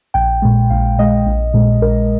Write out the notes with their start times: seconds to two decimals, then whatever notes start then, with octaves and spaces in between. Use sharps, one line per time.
0.14 A#1 G5
0.42 A#2 G#3
0.70 A#1 F5
0.98 A#2 G#3 D#5
1.27 A#1
1.54 A#2 G#3
1.82 A#1 A#4